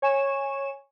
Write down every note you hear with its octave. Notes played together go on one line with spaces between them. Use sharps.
C#5 G#5 C#6 E7